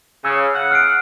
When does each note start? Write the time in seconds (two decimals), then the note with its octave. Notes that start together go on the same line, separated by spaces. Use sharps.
0.25 C#3 E6
0.54 F#5
0.71 F6 C7 D7